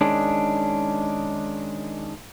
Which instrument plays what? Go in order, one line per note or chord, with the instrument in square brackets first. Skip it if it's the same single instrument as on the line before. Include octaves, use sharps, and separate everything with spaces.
[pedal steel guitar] D#3 G#3 C#4 D4